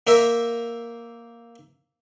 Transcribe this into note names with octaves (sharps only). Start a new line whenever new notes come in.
A#3 A#4 C5 E5